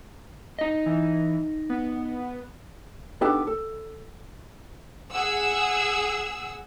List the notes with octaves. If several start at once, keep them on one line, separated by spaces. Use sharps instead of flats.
D#4 D#5
E3
B3
B3 D4 D#4 G4 A4 B4
A4
G#4 F#5 E6